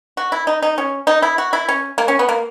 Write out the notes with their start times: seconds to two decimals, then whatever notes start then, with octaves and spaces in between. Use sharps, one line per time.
0.17 F#4
0.32 E4
0.47 D#4
0.62 D#4
0.78 C#4
1.07 D#4
1.22 E4
1.38 F#4
1.53 E4
1.69 C#4
1.98 A#3
2.08 C#4
2.19 B3
2.29 A#3